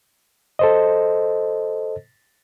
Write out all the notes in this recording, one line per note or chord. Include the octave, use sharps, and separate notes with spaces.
A4 C5 D#5